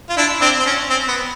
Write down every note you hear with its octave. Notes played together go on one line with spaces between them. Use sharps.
F4
D4 E4
C4 D4
C4
C#4
C4
B3